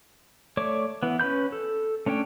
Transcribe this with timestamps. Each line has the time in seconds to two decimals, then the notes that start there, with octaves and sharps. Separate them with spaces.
0.57 A3 C#5 D5 D6
1.03 E3 B3
1.20 C#4 B4 B5 G6
1.52 A4
2.06 A3 C#4 D4 C#5 G5